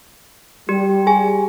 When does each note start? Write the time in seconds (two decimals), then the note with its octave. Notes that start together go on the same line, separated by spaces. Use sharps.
0.69 G3 G4
1.07 G#4 G#5